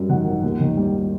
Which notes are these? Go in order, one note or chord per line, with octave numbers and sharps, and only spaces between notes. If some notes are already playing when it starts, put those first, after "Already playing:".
Already playing: F#2 G3
D#3 F#5
G#1
D#2
D#3
G3